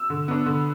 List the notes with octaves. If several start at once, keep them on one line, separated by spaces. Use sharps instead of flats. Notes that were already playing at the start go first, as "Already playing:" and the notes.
Already playing: E6
D3
B3 D4
D3